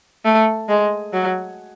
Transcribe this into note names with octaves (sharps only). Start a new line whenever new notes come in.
A3
G#3
F#3